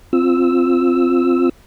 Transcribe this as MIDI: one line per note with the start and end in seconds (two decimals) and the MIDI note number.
0.13 1.49 60
0.13 1.49 65
0.13 1.49 88